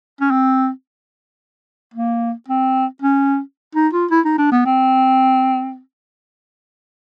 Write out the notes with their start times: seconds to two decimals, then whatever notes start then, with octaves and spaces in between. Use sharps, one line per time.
0.21 C#4
0.31 C4
1.94 A#3
2.48 C4
3.02 C#4
3.75 D#4
3.93 F4
4.11 E4
4.25 D#4
4.38 D4
4.52 B3
4.65 C4